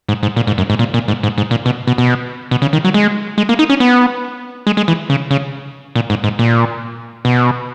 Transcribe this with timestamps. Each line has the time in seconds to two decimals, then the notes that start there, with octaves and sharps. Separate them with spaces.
0.08 G#2
0.23 G#2
0.36 A#2
0.47 G#2
0.58 F#2
0.70 G#2
0.79 A#2
0.94 A#2
1.08 G#2
1.23 G#2
1.38 G#2
1.51 A#2
1.66 B2
1.87 B2
1.98 B2
2.51 B2
2.62 C#3
2.73 D#3
2.84 F#3
2.94 G#3
3.38 G#3
3.49 A#3
3.59 D#4
3.69 C#4
3.80 B3
4.67 G#3
4.77 G#3
4.88 E3
5.10 C#3
5.31 C#3
5.95 A#2
6.10 G#2
6.24 G#2
6.39 A#2
7.25 B2